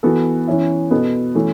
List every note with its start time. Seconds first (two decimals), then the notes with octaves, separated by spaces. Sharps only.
0.03 E3 B3 F#4 A4
0.47 E3 C#4 E4
0.91 B2 B3 A4
1.35 E3 A3 C#4 F#4